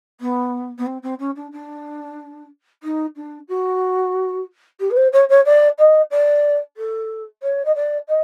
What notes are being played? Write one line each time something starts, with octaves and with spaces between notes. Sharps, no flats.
B3
B3
C4
C4
C#4
D4
D4
D#4
D4
F#4
G4
B4
C5
C#5
C#5
D5
D#5
D5
A4
C#5
D#5
D5
D#5